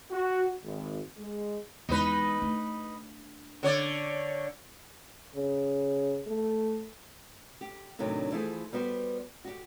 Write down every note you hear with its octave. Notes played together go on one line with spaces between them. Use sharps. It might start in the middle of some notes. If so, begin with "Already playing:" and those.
F#4
G#1
G#3
E2 G#3 D#4 B4
A3 D4
D3 C#5 D5
C#3
A3
G4
A2 C3 D#3 F#3 D4
E3 F3 A3 E4 G#4 C5
G3 B3 F#4 B4 C5
F#4 G4